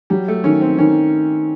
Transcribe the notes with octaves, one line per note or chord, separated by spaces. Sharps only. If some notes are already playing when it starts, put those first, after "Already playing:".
F#3 G3
A3
D#3 C#4
C4
D#3 C#4